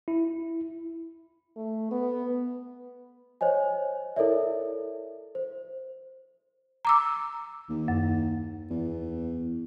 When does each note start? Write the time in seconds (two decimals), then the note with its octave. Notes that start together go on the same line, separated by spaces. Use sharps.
0.08 E4
1.57 A3
1.91 B3
3.41 C5 C#5 D#5 G#5
4.16 E4 A4 A#4 C#5 D5 E5
5.35 C5
6.85 A#5 D6 E6
7.69 D#2
7.88 F#2
8.70 E2